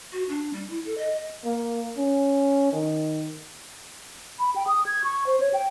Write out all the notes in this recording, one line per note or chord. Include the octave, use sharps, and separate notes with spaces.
F#4
D4
G3
E4
A4
D#5
A#3
C#4
D#3
B5
G5
D#6
G#6
C#6
C5
C#5
G5